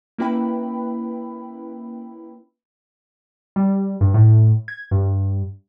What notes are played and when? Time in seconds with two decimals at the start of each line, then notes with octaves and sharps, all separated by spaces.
0.18 A#3 C#4 E4 B4 G5 B5
3.56 G3
4.01 G2
4.14 A2
4.68 G#6
4.91 G2